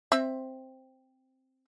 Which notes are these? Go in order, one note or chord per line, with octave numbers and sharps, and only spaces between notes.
C4 E5